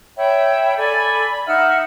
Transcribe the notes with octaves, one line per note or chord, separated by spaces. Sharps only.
C#5 E5 G5 B5
A4 D5 G#5 B5
B5
D#4 E5 F#5 F6